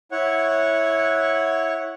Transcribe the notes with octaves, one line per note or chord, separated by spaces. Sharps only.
E4 C#5 F#5 C#6